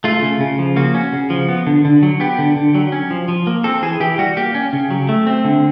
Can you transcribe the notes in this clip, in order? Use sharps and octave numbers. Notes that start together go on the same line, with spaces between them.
A3 F4
C#3
C#3
F3
A#3 F#4
C#4
C#3
F3
B3
D3
D3
F#3
B3 G4
D3
D3
F#3
C#4
F3
F3
A#3
C4 A4
E3 G#4
E3 G4
G3 F#4
A#3 G4
C#4
C#3
F#3
A3
C4
D3